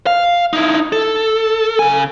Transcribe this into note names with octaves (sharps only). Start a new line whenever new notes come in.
F5
D#4 E4
A4
C#3 G#5